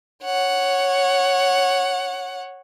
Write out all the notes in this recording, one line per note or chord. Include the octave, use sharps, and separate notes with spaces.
C#5 F#5